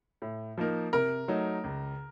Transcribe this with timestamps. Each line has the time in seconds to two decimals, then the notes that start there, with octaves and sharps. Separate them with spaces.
0.22 A2
0.58 F3 A#3 D#4 A#4
0.93 C3 A#4
1.28 F#3 A3 D#4
1.64 C#2